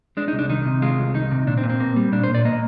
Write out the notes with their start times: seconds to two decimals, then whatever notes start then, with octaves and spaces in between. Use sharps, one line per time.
0.17 G#3 D4
0.28 D#4
0.33 C2
0.39 D4
0.49 D#3 D#4
0.66 C3
0.82 G#3 F4
0.99 C2
1.14 D#3 D#4
1.31 C3
1.47 A#2 D4
1.58 C4
1.63 A#2
1.70 C4
1.80 A#3
1.96 G3
2.12 A#2 D4
2.23 C5
2.29 A#2
2.34 D5
2.45 A#3 D#5